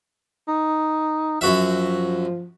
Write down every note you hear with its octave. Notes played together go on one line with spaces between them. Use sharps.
D#4
F#2 F3 F#4 E5